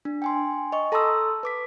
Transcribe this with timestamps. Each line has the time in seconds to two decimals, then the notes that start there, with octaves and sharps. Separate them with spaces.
0.05 D4
0.22 G5 G#5 C6
0.72 D#5 C#6
0.92 A4 A5 A#5 C6 D#6 E6
1.43 B4 D6 B6